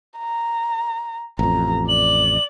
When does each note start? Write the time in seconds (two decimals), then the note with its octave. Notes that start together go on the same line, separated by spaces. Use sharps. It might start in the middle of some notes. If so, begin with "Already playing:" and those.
0.19 A#5
1.39 A1 F2 A#5
1.88 D5 F#7